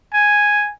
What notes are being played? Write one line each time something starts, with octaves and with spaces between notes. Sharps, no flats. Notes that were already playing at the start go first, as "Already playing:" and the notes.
G#5